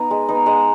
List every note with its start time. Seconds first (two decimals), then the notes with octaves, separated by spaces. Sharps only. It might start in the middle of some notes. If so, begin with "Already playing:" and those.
Already playing: B3 D#4 A#5
0.11 G#3
0.29 B3 D#4
0.46 G#3 F#5